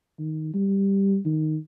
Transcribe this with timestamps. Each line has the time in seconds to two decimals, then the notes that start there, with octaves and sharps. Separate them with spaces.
0.19 D#3
0.54 G3
1.25 D#3